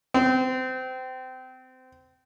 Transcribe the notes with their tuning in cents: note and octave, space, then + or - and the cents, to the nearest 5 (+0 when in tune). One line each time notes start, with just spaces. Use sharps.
C4 -25